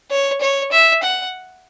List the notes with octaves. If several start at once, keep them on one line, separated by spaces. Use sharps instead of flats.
C#5
C#5
E5
F#5